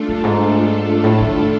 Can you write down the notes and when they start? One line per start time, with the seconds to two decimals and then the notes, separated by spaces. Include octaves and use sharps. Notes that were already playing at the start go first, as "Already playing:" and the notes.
Already playing: A3 D4 F4 A4
0.08 G2
0.24 G#2
1.04 A2
1.21 D#3